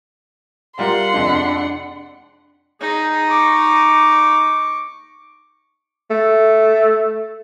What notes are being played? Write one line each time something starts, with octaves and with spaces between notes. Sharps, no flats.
G3 F4 A#4 F#5 C6
F2 C3 G#3 D4
D#4 G#4
C#6 D6
A3